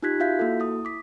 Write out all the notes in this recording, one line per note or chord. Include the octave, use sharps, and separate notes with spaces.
D#4 F4 G4 F#6 G#6 B6
F4 F#4 E5 F5 G6 B6
A#3 E4 F#4 A4
E4 D#6
D6 B6